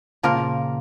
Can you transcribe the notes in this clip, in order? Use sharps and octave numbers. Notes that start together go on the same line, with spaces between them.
A#2 C#3 F3 A#3 F4 A#4